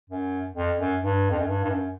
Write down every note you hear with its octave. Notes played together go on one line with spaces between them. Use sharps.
F#2
F2
F#2
G2
F2
F#2
G2
G2
F#2